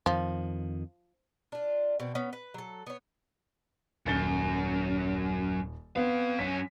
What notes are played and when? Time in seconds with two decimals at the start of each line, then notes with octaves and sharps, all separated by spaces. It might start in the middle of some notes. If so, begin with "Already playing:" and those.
0.06 F2 D#3 F3
1.52 D4 F4
2.00 B2 C4
2.15 B3 C#4
2.33 B4
2.54 F#3 A4
2.87 B3 C#5
4.06 D#1 F#2 A6 G7
5.96 B3 C4 F5
6.39 F#2 C#4 B6